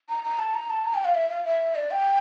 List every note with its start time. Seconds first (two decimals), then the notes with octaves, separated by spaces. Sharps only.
0.09 A#5
0.24 A#5
0.39 A5
0.54 A#5
0.70 A5
0.85 A#5
0.94 G5
1.05 F5
1.15 E5
1.29 F5
1.45 E5
1.75 D5
1.91 G5